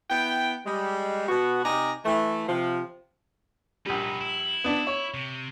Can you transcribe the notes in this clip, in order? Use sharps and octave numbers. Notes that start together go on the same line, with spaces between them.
B3 E4 G5
G3 G#3
B2 B3 F#4
C3 D#4 D5 G#5 A#5
E3 A3
C3 F3
A#1 G3 D#4 B4
E4
B3 D4
C#5
C3